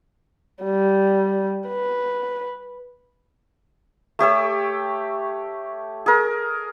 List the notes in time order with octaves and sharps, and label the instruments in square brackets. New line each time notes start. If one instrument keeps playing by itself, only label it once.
[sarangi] G3
B4
[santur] A3 G4 C#5 E6
G#4 A#4